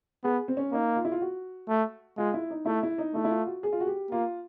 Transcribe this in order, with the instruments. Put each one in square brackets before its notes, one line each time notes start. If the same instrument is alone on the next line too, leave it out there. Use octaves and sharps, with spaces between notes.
[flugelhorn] B3 [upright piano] G#4
[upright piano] C4
C#4
[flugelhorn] A#3 [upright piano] D#4
[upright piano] F4
E4
F4
F#4
[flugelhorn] A3
[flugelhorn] G#3 [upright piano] F4
[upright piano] E4
D#4
[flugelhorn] A3 [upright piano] E4
[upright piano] E4
D#4
[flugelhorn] A3 [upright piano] E4
[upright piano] E4
F4
F#4
G#4
F4
F#4
G4
[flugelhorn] A#3 [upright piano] F4